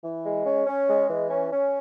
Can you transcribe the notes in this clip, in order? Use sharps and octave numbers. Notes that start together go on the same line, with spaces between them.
E3
G#3
C#4
C#4
G#3
E3
C#4
C#4